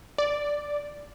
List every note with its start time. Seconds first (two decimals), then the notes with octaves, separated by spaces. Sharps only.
0.18 D5